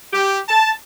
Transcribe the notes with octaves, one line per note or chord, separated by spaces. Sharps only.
G4
A5